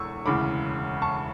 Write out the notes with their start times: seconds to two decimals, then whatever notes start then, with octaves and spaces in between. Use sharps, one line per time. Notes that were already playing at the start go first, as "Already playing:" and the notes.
Already playing: E1 E2 D3 C#6 E6
0.26 E1 D2 C#3 E3 B5 D6
1.02 A5 C#6